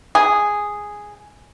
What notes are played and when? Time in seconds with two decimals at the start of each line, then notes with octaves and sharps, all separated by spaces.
0.15 G#4